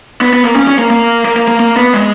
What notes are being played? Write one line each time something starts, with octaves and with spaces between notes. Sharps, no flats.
B3
B3
A#3
C#4
C#4
A#3
A#3
A#3
A#3
A#3
A#3
B3
G#3